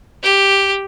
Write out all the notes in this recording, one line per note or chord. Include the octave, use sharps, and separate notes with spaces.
G4